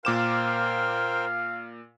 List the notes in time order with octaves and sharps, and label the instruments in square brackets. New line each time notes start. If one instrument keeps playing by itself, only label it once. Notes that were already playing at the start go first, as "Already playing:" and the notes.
[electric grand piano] A#2 D6 E7 [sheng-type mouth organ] A#4 C5 G5 [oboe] F5